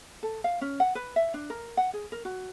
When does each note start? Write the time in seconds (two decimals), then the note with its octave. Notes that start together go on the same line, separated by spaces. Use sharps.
0.23 A4
0.44 F5
0.61 C#4
0.80 F#5
0.95 B4
1.16 E5
1.34 D4
1.50 A#4
1.77 F#5
1.93 G#4
2.12 A#4
2.25 F#4